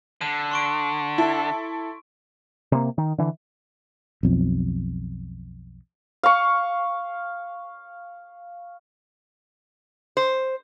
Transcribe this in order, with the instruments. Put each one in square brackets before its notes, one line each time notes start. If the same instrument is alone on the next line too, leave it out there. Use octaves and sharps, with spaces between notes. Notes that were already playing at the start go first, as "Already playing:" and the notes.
[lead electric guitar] D3 [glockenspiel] D#7
[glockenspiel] C6 C#6 D7
[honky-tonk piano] E4 A4
[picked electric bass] C3 A#3
D#3
D3 E3
[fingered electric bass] B1 F2
[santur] F5 C#6
[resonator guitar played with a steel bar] C5